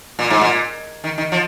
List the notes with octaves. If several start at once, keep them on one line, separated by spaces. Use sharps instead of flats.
A#2
G#2
A#2
D#3
D#3
F3